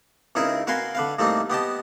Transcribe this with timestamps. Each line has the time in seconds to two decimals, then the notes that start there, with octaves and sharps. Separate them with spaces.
0.35 C#2 C#3 D#4 E4 G#4 A#4
0.67 F#4 A#4 B4 F5 G#5 C6
0.95 D3 B4 F5
1.19 A2 G3 A3 A#3 C4 D#4
1.50 B3 G4 D#5 A5